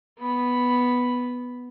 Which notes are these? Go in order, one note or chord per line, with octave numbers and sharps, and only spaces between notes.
B3 B5